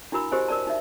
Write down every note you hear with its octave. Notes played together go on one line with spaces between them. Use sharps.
D4 E4 F#4 A#4 B5
F#4 G4 A#4 C5 D#5 G#5
A#4 D5 A5
D#4 E5